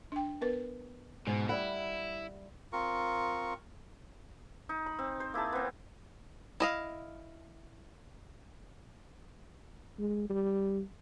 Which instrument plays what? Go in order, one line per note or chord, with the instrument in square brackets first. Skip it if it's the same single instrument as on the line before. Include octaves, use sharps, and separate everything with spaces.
[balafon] D4 G5
B3 A#4 B4
[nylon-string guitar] G#2 [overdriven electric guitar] B2
[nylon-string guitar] G3 E5 F#5 [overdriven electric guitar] E4 [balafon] B5
[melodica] C4 F4 A#4 C#6
[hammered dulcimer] D#4
B5
C4
C5
A#3 E4 G#4 A5
B3 C4
[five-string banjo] E4 D#5 F5
[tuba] G#3
G3